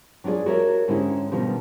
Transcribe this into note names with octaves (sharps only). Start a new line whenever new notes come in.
F#3 D4 F4 G#4 D5
F#4 G4 A4 A#4 C#5 E5
G#2 D3 C#4 D#4 E4 G4
B2 D3 D#3 F3 G3